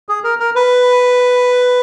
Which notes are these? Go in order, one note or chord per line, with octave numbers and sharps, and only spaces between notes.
G#4
A#4
A#4
B4